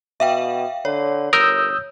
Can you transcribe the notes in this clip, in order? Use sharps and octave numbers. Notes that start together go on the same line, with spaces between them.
B2 E5 F5 G5
D3 C#5
G1 A#4 D#6 E6 G6